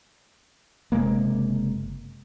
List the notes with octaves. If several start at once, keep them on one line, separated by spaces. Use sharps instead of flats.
F#1 C3 G#3 A#3